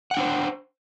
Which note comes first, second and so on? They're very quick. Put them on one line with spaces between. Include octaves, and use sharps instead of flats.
F#5 G5 D4 C5